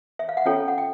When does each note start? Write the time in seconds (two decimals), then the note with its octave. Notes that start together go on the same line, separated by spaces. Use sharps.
0.19 E5
0.29 F5
0.37 F#5
0.46 C#4 F4 A4 C#5 G5
0.68 F#5
0.78 G5